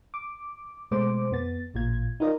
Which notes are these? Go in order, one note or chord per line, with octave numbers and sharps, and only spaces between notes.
D6
B2 G#3 A3 C5 D6
F2 B3 A6
A1 A#2 F4 G#6
D#4 F4 A#4 D5 D#5